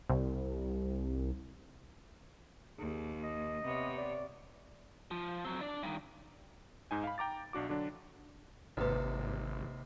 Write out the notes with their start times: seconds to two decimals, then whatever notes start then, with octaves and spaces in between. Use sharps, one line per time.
0.09 C2
2.79 D#2 G#4
3.24 D#5
3.62 C3 B3 C#5
3.98 D5
5.11 F3
5.45 F#3 C4
5.61 D4 D5
5.83 G2 D#3
6.91 G#2 D#4 G#5
7.04 F5 B5
7.18 G5 A#5 D6 A6
7.53 B1 D4 F#4 D6
7.69 D3 F#3 D4
8.77 G#1 D#2 C3 B4 D#5 A5